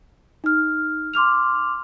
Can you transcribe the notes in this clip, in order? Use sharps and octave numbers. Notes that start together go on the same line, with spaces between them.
D#4 F6
C6 D6 F6 F7